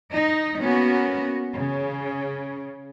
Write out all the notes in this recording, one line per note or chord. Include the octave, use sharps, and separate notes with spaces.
D#4
A#3 B3 C#4 F#4
C#3